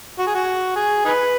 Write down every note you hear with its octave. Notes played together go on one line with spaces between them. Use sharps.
F#4
G#4
F#4
G#4
D#4 G#4 B4